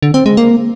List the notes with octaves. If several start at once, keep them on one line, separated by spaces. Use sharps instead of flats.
D3
C4
G#3
A#3